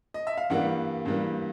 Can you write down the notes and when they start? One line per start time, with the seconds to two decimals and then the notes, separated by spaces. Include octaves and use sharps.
0.14 D#5
0.27 E5
0.37 F5
0.50 G2 E3 G3 A#3 F#5
1.06 G2 E3 G3 A#3